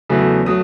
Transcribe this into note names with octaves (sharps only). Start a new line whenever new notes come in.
E2 C#3 F#3 A3
F#3 A3 D#6